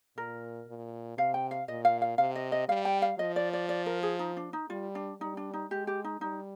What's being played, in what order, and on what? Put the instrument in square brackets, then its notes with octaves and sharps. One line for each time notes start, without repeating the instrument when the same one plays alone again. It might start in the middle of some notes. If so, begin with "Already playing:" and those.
[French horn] A#2 [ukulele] A#4
[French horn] A#2
[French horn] C3 [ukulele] F5
[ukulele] G5
F5
[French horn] A#2 [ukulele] D#5
[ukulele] F5
F5
[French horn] C3 [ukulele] F5
[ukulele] D#5
D#5
[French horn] G3 [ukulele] F5
[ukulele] G5
F5
[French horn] F3 [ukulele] D#5
[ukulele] D5
D5
D5
A#4
G#4
D#4
D4
D#4
[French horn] G3 [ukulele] F4
[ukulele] D4
[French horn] G3 [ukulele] D#4
[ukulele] D4
D#4
[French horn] G#3 [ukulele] G4
[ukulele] G4
D#4
[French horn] G3 [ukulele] D#4